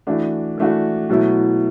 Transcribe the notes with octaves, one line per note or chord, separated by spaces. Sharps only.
E3 A3 D4 F#4
E3 A3 D4 F#4
B2 F#3 A3 E4